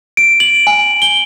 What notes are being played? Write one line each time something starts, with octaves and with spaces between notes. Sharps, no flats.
D7
F#7
G#5
G7